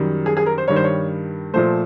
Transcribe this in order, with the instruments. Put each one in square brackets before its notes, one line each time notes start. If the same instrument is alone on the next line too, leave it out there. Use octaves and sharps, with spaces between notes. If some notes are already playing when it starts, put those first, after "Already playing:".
Already playing: [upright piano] F#2 D#3 G3
G#4
G#4
A#4
C5
G2 D#3 G3 C#5
C5
C#5
A#2 F3 A3 C5